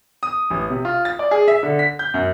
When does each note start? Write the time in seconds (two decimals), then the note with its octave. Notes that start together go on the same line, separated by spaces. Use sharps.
0.23 D#6
0.50 A1
0.70 C3
0.85 F4
1.05 A6
1.19 D5
1.31 G#4
1.48 E5
1.63 D3
1.79 B6
1.99 G6
2.14 F#2